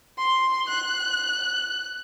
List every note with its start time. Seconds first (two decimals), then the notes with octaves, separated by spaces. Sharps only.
0.18 C6
0.68 F#6